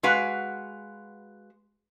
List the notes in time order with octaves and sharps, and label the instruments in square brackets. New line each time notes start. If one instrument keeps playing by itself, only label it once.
[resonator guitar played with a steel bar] G#3 F#4 B4 F5 F#5